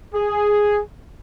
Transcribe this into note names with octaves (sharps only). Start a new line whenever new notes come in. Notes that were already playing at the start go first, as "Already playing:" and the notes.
G#4